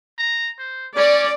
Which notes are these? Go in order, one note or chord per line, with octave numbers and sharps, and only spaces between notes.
A#5
C5
C#4 D5